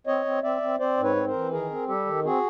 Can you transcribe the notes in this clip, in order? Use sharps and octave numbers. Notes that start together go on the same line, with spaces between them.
C4 C#5 D#5
C4
C4 D5 E5
C4
C4 C5 D5
G#2
B4 C#5
C4
A#4 C5
E3
D#3 G#4 A#4
C4
G3 G4 A4
D#3
C4 F#4 G#4